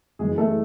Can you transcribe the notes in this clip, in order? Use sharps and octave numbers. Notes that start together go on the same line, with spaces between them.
F#1 F#2 E3 G#3 G#4
A3 A4